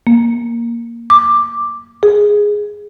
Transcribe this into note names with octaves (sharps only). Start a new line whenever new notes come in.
A#3
D6
G#4